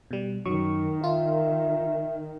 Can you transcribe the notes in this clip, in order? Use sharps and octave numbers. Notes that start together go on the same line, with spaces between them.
B2 G3
F#2 D#3 F#3 D#4 C#6
F4 E5